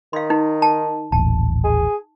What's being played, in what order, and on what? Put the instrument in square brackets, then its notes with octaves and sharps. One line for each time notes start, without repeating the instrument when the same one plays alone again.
[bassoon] D#3 [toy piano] F5 C6
[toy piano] D#4
A5
[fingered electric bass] D#1 A1 [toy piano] A5
[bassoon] G#4